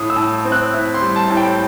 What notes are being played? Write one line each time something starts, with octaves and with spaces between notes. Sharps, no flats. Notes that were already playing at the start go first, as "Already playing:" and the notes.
Already playing: A2 D#6
E6
A2
C4
F#6
E4
C6
G3
A5
A2
G5